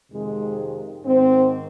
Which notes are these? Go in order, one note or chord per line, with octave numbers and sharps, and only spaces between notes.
F2 C3 D#3 G#3
G#2 D#3 C4